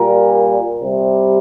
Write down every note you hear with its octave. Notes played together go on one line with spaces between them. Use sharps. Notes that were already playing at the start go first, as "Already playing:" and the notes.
Already playing: A#2 G3 A#4
C3 G3